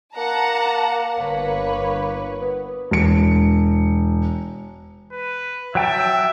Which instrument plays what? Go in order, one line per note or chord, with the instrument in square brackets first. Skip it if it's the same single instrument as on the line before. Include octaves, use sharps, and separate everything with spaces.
[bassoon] A#3 [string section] F#5 A5 A#5
[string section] G1 B4 C#5
[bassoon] B3
[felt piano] E1 C#7
[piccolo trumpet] B4
[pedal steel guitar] F#3 G5 A5 [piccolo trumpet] E5